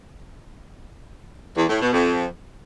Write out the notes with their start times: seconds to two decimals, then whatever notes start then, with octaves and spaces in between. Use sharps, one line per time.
1.57 E2
1.69 A2
1.81 B2
1.93 F2